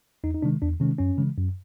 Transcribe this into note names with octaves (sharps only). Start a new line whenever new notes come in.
E2 D#4
D#4
C3 D#3 G#3 D4
E2 D4
C3 D#3 G#3 C#4
F#2 C#4
C#3 E3 G#3
F#2